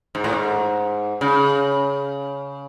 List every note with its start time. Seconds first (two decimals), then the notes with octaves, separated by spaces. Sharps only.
0.15 G#2
0.24 A2
0.33 G#2
1.21 C#3